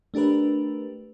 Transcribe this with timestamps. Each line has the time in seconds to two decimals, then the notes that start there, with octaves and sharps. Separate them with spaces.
0.14 A3 D4 G4 A#4 B4